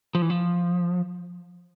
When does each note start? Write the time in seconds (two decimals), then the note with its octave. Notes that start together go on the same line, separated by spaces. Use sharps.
0.15 F3
0.22 E3
0.30 F3